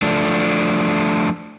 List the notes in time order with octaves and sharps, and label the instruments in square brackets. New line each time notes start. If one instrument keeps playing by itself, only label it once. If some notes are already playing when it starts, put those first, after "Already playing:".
[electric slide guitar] F3 A3 D4